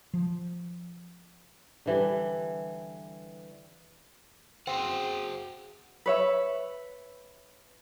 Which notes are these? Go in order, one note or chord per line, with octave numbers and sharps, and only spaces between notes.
F3
D3 E3 G3
C4 F#4 G#4 F#5
B4 C#5 E5